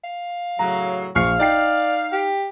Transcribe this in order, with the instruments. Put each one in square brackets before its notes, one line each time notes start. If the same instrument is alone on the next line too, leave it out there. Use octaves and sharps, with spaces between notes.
[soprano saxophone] F5
[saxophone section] A2 C#3 F#3 [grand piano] A#5
[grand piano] A#1 F6 C7 [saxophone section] F5 [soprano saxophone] C#6
[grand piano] D#4 G5 C7 [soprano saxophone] D5
[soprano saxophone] G4